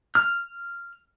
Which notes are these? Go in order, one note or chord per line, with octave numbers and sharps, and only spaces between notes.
F6